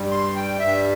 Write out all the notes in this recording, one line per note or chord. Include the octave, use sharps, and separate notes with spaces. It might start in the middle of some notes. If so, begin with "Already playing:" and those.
Already playing: G2 G3
C6
G5
G2 G3 E5